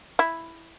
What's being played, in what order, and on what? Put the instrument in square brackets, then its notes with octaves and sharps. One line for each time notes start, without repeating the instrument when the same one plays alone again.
[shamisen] E4